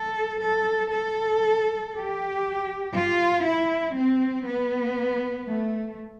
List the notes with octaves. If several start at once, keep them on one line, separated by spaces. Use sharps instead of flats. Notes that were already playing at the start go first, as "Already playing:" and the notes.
Already playing: A4
A4
A4
G4
F4
E4
C4
B3
A3